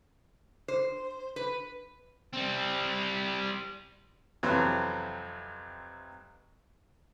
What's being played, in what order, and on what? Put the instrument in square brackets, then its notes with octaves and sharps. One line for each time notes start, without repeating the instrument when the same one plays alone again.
[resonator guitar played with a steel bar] C5
B4
[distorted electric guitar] G3 C4
[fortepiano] F2 C3 E3 F#3